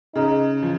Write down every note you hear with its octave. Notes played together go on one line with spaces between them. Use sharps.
C#3 D#4
F3